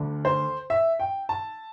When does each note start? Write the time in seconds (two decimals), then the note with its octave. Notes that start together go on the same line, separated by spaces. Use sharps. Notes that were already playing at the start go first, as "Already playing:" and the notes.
Already playing: D2 D3
0.25 C5
0.70 E5
1.00 G5
1.29 A5